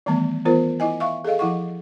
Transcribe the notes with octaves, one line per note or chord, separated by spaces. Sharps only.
D#3 E3 G3 A3 B3 A5
E3 B3 F4 A#4 C5
E4 D#5 G#5
E5 F5 C#6
G#4 A4 D#5 F5
F3 E4 F#5 C#6